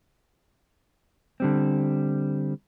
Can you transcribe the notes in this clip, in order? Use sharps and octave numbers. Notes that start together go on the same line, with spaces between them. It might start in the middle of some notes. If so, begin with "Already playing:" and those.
D3 G3 C4